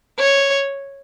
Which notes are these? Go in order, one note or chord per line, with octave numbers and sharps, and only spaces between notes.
C#5